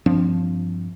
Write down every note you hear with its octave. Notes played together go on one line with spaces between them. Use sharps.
G2 F3 C4 D4